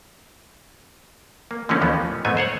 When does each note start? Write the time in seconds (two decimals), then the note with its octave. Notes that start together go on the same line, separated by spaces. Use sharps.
1.51 A#3
1.69 D3 F3 A3 A#3 C#4 D#4
1.81 D#2 E3 F3 A3 B3
2.25 G#2 A3 B3 C4 G#5
2.37 C5 C#5 F#5